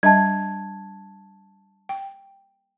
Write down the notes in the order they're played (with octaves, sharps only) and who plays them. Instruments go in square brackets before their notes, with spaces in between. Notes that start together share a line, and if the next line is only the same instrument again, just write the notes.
[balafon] G3 D4 D#5 [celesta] A5 G#6
[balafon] G5